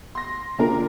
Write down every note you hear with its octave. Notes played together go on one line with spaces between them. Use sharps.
C6 A#6
D3 A#3 D4 F4 A#4 A#5